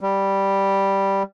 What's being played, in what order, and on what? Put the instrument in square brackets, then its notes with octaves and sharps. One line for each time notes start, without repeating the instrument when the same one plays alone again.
[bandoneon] G3